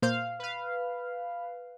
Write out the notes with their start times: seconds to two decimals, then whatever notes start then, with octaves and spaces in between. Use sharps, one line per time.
0.02 A#2 C5 F5 G6
0.39 B4 F5